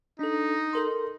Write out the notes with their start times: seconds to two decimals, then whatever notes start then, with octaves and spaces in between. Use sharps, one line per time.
0.19 D4 D#4 A4
0.73 A4 A#4 C6